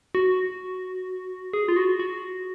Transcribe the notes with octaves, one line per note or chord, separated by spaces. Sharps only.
F#4
G#4
F4
F#4
F#4